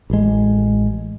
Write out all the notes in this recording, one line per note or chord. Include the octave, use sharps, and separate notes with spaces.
A1 G#3